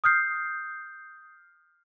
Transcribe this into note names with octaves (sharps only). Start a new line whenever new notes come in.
D#6 F6 G6 C7